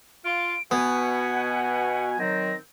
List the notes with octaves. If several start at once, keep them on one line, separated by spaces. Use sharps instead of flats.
F4 D7
B2 B3 F#4 F#5 G#5
D#3 F#3 C4 A#6